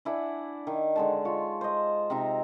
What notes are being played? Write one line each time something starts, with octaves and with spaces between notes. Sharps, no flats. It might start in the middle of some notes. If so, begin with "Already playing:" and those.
D4 E4 F#5 G#5
D#3
D3 G#3 A5
F4 C#5
C5 D#5
C3 C4 D#4 A#5